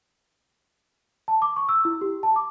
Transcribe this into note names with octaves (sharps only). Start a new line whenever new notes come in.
A5
D6
C#6
E6
E4
G4
A5
D6